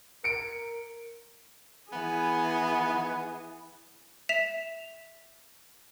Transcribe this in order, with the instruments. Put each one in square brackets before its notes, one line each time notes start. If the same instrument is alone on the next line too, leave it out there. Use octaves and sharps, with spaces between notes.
[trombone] A#4 [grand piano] C#7 D7
[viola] E3 [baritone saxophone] B3 [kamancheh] G#4
[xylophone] E5 B6 E7 F7